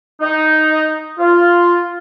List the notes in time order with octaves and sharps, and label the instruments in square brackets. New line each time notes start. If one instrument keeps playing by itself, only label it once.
[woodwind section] D#4
F4